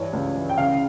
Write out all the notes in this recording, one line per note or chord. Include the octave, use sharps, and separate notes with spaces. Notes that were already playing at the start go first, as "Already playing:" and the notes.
Already playing: G2 E3 C#5
C#2
E3
G5
C#3 F5